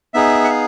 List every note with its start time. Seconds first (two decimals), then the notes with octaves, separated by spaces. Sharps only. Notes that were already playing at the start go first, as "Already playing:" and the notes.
0.14 B3 D#4 G#4 E5
0.44 F#5
0.49 F5